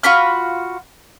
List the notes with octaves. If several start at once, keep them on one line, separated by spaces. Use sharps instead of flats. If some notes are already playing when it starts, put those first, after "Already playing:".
F4 F#4 B5 F6